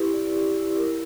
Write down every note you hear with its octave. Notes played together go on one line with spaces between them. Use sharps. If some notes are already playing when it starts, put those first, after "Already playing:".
Already playing: E4 G4 B4
D5
G4
E4
A#4